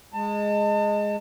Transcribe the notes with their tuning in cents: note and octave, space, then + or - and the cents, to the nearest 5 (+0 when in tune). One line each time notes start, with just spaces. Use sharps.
G#3 -5 A5 +30